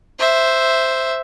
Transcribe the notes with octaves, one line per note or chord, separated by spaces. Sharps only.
C5 E5